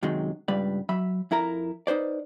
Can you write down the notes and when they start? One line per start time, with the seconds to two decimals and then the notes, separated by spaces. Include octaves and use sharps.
0.03 F#2 C3 D#3 F#3 G#3
0.48 C#2 G2 G3 B4 D5
0.89 F#3 E5 B5
1.31 F2 E4 A#4 A#5
1.87 D#4 B4 C5 D5